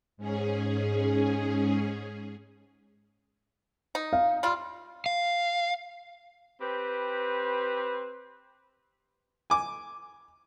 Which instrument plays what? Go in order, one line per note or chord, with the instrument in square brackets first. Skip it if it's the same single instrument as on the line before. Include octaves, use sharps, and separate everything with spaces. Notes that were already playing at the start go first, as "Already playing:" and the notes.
[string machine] G#2 C#4 G#4
[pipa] D#4
[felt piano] F5
[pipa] G3 F4
[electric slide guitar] F5
[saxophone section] C4 G4 B4
[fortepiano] G#5 D6